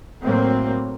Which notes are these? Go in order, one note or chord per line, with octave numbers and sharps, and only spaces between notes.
A2 F#3 A#3 C4